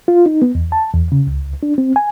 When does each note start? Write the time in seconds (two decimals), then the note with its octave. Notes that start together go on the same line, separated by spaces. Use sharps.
0.08 F4
0.26 D#4
0.42 B3
0.55 E2
0.72 A5
0.94 E2
1.12 C#3
1.27 C#2
1.63 D4
1.78 C4
1.96 G#5